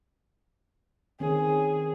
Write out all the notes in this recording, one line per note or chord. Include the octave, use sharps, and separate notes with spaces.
D#3 C4 C#4 G#4